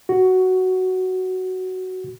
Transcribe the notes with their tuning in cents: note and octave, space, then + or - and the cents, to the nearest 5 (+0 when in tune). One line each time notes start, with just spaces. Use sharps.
F#4 +5